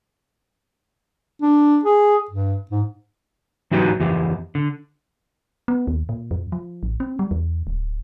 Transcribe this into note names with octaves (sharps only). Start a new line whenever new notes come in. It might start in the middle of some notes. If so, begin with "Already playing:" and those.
D4
G#4
G2
G#2
E3 F#3 D#4 F#4 G4 B4
F2 E3 G4
D3
B3
D#2
A#2
F2
F3
A1
C4
G3
E2
D1